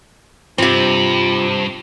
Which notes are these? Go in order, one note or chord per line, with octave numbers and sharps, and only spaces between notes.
G2 C3 C4 F4